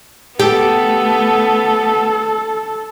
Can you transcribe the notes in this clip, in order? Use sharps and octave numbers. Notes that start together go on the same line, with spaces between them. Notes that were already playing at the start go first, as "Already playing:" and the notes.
A3 B3 G4 A4